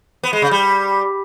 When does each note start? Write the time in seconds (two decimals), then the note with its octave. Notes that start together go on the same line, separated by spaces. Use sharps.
0.24 B3
0.33 G#3
0.42 C#3
0.51 G3